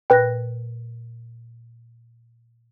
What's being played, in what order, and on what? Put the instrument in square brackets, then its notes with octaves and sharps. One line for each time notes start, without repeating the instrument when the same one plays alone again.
[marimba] A#2 F#6 A#6 [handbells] B4 G5